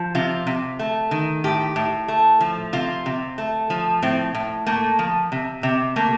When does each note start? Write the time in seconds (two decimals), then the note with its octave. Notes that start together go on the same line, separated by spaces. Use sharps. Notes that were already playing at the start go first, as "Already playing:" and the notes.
Already playing: F3
0.15 C3 F4
0.47 C3
0.79 A3
1.11 D#3
1.44 A2 G4
1.76 A2
2.08 A3
2.41 F3
2.73 C3 F4
3.06 C3
3.38 A3
3.70 F3
4.02 A2 C4
4.35 A2
4.67 A3 A#3
4.99 F3
5.32 C3
5.63 C3
5.96 A3 A#3